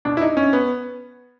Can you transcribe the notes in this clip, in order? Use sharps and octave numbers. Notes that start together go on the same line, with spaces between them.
B2 D4
E4
D#4
C#4
B3